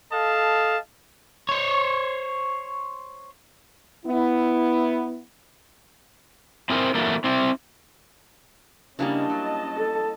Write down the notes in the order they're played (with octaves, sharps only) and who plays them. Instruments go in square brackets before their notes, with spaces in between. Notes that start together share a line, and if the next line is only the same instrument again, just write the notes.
[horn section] A4 D#5 F5 A5
[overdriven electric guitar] C5 C#5
[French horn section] B3 E4
[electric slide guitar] C4 E4 G#4 A#4 C5
E3 F#3 A3 A#3
C4 E4
[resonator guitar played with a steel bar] C#3 D4 [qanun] G3 A#3 E4 [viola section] C#4 D#5 A5
[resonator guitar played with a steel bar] F#3
[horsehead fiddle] A4